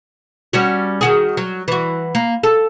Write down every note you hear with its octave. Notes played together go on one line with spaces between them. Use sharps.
G3 C#4 F#4
D#3 F#4 G#4
F#3
E3 F#4
A#3
A4